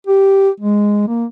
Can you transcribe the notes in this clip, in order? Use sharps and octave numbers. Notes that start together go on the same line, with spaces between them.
G4
G#3
A#3